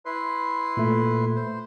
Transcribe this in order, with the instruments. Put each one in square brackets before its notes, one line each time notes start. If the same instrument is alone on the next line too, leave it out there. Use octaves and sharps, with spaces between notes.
[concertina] E4 B4 C6
[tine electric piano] A#2 A3
[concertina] C5